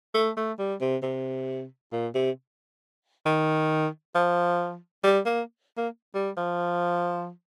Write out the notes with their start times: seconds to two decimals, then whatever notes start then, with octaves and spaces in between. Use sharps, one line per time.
0.14 A3
0.37 A3
0.59 G3
0.81 C3
1.03 C3
1.92 A#2
2.15 C3
3.26 D#3
4.15 F3
5.03 G3
5.26 A#3
5.78 A#3
6.15 G3
6.37 F3